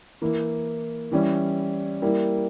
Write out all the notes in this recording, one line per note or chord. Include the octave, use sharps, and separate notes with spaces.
E3 A#3 E4
E3 G3 C#4 E4
G3 A#3 E4